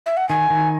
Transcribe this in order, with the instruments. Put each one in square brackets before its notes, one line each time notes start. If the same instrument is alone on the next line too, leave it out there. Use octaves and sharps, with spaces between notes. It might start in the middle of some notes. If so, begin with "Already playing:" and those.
[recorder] E5
F#5
[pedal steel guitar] D#3 [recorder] G#5
[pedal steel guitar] D#3